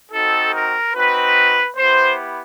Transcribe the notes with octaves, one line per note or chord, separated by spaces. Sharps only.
C4 D#4 F#4 A4
A#4
C4 D#4 F#4 B4
B3 E4 G4 C5